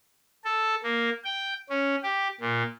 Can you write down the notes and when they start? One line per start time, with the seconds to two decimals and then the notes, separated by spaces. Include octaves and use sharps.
0.44 A4
0.84 A#3
1.24 G5
1.70 C#4
2.03 G4
2.40 A#2